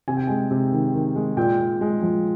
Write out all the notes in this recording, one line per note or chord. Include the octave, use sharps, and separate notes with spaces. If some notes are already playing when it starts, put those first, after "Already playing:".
C3 G#5
G5
G#3 G#5
C3
D#3
D#3
G#3
A#2 G5
A#2
G#3
F3